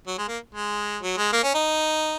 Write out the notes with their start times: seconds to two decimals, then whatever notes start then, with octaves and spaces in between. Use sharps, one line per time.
0.07 F#3
0.18 G#3
0.28 A#3
0.54 G#3
1.02 F#3
1.17 G#3
1.33 A#3
1.43 C#4
1.54 D#4